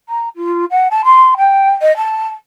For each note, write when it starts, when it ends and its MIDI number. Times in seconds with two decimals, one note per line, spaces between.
0.09 0.29 82
0.36 0.65 65
0.70 0.88 78
0.91 1.02 81
1.05 1.35 84
1.37 1.70 79
1.81 1.95 75
1.97 2.27 81